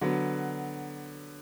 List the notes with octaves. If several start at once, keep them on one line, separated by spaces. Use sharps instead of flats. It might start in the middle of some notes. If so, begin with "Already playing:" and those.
D3 F#3 B3